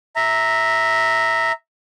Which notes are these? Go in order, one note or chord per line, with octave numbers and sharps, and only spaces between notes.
E5 A#5